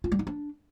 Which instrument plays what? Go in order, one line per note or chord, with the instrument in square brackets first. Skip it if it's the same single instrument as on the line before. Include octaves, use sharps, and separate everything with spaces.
[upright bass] F4
G3
D#4
D4